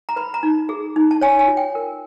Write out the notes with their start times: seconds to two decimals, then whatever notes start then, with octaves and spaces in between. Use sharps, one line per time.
0.09 A#5
0.16 B4 B5
0.34 A#5
0.43 D#4
0.69 G#4
0.96 D#4
1.11 A5
1.21 C#5 G#5
1.39 G#5
1.48 F4
1.57 G5
1.75 A#4